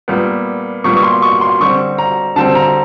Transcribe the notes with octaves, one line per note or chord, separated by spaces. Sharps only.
A#2 G3 B3
A#2 G3 B3 C#6
C#6
C6
C#6
C6
D3 G3 C4 C#6
A#5
D3 G3 C4 A5
A#5